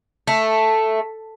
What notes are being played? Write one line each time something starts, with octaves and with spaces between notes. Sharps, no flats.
A3